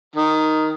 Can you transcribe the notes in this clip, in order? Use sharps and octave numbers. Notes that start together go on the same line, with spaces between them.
D#3